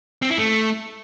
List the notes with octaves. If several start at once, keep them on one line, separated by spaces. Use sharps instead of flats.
C4
E4
A3